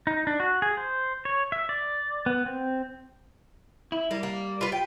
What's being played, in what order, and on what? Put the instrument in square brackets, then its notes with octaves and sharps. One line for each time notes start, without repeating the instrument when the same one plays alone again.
[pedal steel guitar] D#4
D4
F#4
G#4
C5
C#5
E5
D5
B3
C4
[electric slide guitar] E4
[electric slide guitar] G3 [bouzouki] A#3
[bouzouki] A#3
F4 B4
G5